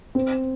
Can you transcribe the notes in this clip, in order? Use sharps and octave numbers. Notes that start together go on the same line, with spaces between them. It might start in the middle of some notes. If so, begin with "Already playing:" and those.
C4